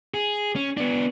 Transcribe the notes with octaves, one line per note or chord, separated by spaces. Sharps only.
G#4
C#4
B3 D4